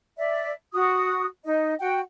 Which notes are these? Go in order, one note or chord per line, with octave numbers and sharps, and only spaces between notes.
D5 E5
F#4 D#6
D#4 D#5
F#4 F#5 G5